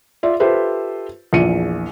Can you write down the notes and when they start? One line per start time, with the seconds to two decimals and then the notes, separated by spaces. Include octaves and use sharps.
0.23 F4 D5 E5
0.40 F4 G4 A4 B4 C5 E5
1.33 A#1 E2 F3 C#7 D#7